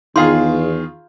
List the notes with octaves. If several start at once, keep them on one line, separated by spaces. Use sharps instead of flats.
E2 D#3 F4 G#4 F5 C6